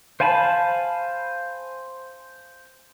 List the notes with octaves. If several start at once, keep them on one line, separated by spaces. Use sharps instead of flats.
C5 F5 G#5 A5 B5